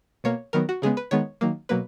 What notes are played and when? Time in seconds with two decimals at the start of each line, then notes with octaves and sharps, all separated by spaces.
0.24 B2 A#3 C#5
0.53 D#3 F#3 B3 A#4
0.69 F#4
0.82 C#3 G#3 B3 G#4
0.97 B4
1.11 D#3 G#3 B3 C#5
1.41 D#3 F#3 A#3
1.69 B2 F#3 A#3 B4